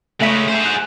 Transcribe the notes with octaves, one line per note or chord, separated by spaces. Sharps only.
C#3 G#3 A3 E5 B6
G#4 C5
F#6